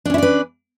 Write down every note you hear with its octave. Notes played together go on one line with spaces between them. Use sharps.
C#4 D4 E4 B4 D5